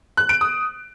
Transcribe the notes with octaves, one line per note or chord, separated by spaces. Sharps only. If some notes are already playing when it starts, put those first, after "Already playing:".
F#6
D7
D#6